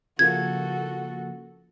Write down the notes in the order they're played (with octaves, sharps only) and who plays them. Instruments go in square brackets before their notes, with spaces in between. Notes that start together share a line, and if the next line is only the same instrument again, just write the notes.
[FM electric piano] C#3 F3 A#3 [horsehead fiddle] F#4 A4 [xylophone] G#6